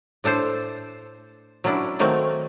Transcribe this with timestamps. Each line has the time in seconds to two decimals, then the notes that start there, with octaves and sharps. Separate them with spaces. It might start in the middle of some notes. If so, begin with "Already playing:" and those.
0.24 A2 D4 A4 C5
1.64 F#3 A#3 C#4 D4 E4
1.99 D#3 F#3 A3 A#3 C4